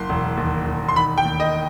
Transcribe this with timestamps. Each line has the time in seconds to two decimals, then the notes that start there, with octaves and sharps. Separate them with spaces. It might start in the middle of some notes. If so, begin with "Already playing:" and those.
Already playing: F#1 C6
0.09 E1
0.37 D#2
0.67 E1
0.89 C6
0.96 D#3 B5
1.18 G5
1.25 D#2
1.40 D#5